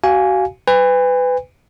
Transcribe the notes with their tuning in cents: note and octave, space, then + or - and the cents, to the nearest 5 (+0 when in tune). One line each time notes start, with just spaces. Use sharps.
F#4 +30 F5 +0 G#5 +0
B4 +25 G#5 -40